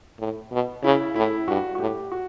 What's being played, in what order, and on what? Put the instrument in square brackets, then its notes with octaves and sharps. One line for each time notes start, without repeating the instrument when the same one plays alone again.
[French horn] A2
B2
[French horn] C#3 [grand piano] E4
[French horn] A2 [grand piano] E4
[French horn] G2 [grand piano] F#4
[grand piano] F#4
[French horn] A2 [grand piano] G4
[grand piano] F#4